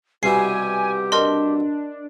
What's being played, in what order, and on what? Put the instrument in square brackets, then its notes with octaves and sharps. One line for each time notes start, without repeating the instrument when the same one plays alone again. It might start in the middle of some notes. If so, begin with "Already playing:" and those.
[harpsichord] C2 B2 E4 [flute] G4 [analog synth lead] G#5 [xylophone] C7
[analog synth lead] D4 [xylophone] A#4 D#5 C6